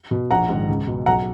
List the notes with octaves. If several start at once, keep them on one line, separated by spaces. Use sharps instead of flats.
B2
A#1 F#5 A#5
G#2 D#3
C#2
B2
B1 F#5 A#5